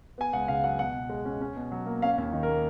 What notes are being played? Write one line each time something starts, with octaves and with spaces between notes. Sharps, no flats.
B3 G#5
C#2 F#5
C#3 F5
F#3 F#5
B2 F#5
B2
G#3
C#4
C#4
B2
F#3
A#3
C#4 F5
D#2
D#3
A#4
A#3